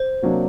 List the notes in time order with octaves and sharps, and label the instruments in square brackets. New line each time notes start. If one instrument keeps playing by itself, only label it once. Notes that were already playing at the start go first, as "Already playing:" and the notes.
Already playing: [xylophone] C5
[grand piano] C3 F#3 A#3 D4